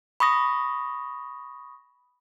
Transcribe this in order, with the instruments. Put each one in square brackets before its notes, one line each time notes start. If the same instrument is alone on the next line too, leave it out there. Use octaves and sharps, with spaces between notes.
[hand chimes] B5 C#6 D#6 A#6